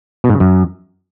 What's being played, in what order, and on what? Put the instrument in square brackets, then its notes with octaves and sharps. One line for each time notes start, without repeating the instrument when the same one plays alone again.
[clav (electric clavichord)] B2
G#2
C#3
F#2